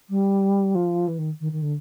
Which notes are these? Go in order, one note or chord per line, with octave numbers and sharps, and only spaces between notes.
G3
F3
E3
D#3
D#3
D#3
D3